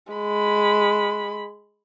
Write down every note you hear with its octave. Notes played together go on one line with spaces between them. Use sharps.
G#3 B5